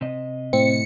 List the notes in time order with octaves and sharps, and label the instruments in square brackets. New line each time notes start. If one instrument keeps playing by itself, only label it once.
[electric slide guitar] C3 D#5
[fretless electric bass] A2 [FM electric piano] C4 [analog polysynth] C#7